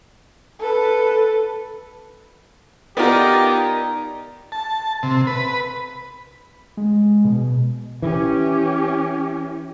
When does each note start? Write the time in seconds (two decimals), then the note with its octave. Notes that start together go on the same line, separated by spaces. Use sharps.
0.60 A4 B4
2.97 B3 D#4 F4 G4 A#4 D5
4.52 A5
5.03 C3
5.27 B4
6.77 G#3
7.25 B2
8.02 E3 C#4 G4